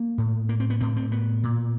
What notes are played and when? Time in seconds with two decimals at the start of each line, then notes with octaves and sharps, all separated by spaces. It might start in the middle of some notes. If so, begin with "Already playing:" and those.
Already playing: A#3
0.18 A2
0.49 A#3
0.60 C4
0.70 B3
0.80 A2 C4
0.96 C4
1.12 B3
1.43 A#2